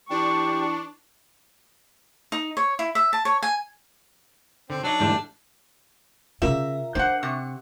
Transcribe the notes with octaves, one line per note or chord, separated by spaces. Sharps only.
E3 D4 G4 C#6
D#4
C#5
E4
E5
A5
C#5
G#5
D3 C4
F#3 D4 D#4
E2 G#2 D3 G3 A3
C#3 C#4 F4 A#4 E5 A#5
D4 C5 F#5
C3 C#6